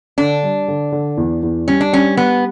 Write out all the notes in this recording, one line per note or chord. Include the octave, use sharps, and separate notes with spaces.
D3 D4
G3
D3
D3
E2
E2
G3 C#4
D4
G3 C#4
G3 B3